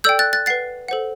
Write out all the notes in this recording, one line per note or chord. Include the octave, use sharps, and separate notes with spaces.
A4 D5 G5 E6 G6
F#6 A6
F#6 A6
B4 F#5 A6 C7
A4 C5 F#5